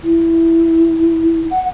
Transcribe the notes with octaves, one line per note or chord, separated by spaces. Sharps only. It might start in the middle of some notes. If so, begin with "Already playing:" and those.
E4
F#5